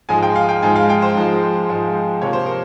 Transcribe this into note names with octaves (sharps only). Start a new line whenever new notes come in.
G#2 F3 G#3 G#5
G5
F5
G5
G#2 F3 G#3 G#5
F5
G5
C5
G#2 F3 G#3
G#2 F3 G#3
C3 F3 A#3 C#5
C5
A#4